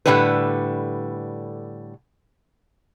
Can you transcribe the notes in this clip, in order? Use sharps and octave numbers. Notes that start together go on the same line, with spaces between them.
A2 D3 F3 G3 A4 B4